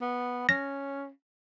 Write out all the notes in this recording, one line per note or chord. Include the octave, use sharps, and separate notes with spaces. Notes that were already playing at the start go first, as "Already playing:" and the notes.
B3
C#4 A#6